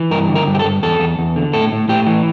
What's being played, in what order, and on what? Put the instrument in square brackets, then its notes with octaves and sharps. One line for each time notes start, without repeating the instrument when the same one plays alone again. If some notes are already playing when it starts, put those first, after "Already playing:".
Already playing: [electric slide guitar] E3
G2 A#4
D3
A#4
G2
G4
A4
G2
E2 A4
E2
E2
D3
A2 A4
A2
A2 G4
E3